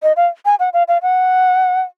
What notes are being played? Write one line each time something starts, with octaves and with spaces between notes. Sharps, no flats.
D#5
F5
G#5
F#5
F5
F5
F#5